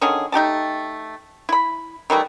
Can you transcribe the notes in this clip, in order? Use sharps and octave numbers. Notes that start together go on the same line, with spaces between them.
D3 D#3 C#4 G#4
A3 D#4 G4 A5
E4 B5
D#3 E3 G3 A3